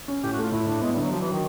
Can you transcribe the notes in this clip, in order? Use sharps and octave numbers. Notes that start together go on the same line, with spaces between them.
C#4
A2 G4
F#4
A3
F4
A2 E4
A2 D4
G#3 B3
G3
D3 F#3
F3 F#3
E3
D#3 F#3